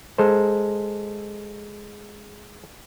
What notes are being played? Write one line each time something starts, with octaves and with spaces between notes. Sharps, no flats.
G#3 A4 C5